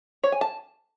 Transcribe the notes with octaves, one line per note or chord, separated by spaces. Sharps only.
C#5
G#5
A5